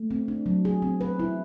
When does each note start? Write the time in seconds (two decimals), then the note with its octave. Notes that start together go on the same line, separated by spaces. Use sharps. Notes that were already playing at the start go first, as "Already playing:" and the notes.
Already playing: A3
0.11 C4
0.28 D4
0.46 F#3
0.65 G#4
0.82 C4
1.01 B4
1.20 E4